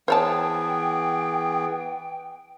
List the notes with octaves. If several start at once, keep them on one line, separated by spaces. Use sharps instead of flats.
E3 B3 G#4 C5 C#5 G5 A5